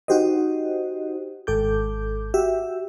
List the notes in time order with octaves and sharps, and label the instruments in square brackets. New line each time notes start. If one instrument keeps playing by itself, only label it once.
[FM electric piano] D#4 F#4 G4 C5 D#5
G#1 A4 D6 G6
F#4 G4 E5